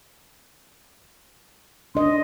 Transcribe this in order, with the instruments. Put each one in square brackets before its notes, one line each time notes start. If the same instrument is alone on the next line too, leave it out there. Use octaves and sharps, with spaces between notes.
[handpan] D4 D#5 [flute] C6